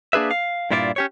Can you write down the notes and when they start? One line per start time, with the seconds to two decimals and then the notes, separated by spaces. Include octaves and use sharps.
0.13 A#3 D4 G#4 B4 E5
0.31 F5
0.71 G2 A#2 E4 F4 B4 D5
0.96 C#4 G4 C#5